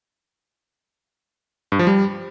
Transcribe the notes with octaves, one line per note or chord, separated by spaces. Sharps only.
G2
F3
G3